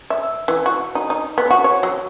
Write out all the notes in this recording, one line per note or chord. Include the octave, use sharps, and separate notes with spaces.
E5
E3
F#4
D#4
D#4
B3
F#4
C#5
F#3